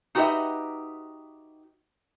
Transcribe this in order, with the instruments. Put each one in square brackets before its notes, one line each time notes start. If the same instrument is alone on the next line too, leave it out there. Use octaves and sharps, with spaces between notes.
[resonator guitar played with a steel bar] D#4 F#4 G4 B4 D#5 E5